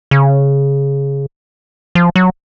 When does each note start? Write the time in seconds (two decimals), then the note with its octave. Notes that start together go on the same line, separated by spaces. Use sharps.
0.11 C#3
1.95 F3
2.16 F#3